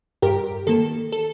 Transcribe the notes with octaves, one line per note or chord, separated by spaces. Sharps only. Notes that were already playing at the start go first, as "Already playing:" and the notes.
G2 G4 A#4
D#3 A#3 A4
A4